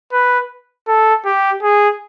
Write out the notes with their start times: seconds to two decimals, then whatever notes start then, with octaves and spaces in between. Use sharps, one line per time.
0.13 B4
0.88 A4
1.25 G4
1.63 G#4